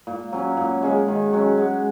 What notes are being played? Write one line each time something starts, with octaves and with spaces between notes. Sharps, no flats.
A#2
F#3 C#4
A#2
G#3 C#4 G#4
D#3
F#3 C#4 F#4
G#3